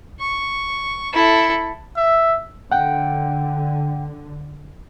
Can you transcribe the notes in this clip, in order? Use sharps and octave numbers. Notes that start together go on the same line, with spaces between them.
C#6
E4 A4
E5
D3 F#5 G5